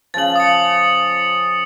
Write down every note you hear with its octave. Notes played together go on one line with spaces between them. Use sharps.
C#3 F3 A6 F#7
D#6 C#7